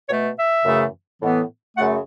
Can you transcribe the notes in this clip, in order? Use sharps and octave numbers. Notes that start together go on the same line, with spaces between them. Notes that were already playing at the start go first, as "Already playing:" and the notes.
B2 A3 C#5
E5
F#2 C#3 E3 A3
A2 E3 B3
F#2 C#3 A3 F#5